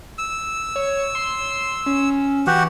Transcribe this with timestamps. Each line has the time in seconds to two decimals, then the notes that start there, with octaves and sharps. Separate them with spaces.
0.18 E6
0.76 C#5
1.15 C6
1.86 C#4
2.47 E3 F#4 G4 F#5